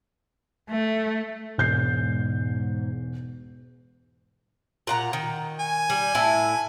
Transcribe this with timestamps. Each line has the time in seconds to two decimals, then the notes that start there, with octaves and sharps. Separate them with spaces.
0.69 A3
1.58 E1 G#2 G6 C7
4.87 A#2 F#5 A#5
5.13 D#3
5.59 G#5
5.90 G3
6.15 A2 E4 A5